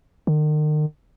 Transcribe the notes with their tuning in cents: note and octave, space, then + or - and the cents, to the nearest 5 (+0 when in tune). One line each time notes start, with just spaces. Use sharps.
D#3 -40